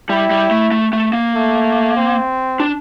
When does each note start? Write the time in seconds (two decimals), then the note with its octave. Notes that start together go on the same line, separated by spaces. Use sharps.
0.10 G3 E4
0.31 G3
0.51 A3
0.72 A3
0.93 A3
1.13 A#3
1.35 A3
1.96 C4
2.60 D4